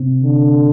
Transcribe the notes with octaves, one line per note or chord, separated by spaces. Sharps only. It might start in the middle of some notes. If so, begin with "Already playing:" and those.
Already playing: C3 C4
D3